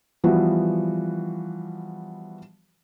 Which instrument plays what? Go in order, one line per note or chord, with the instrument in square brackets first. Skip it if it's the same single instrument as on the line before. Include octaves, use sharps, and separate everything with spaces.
[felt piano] E3 F3 G3 B3 F#4